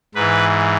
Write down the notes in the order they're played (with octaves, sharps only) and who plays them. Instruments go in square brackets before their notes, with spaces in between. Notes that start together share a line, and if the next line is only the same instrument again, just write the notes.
[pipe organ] G#2 E3 B4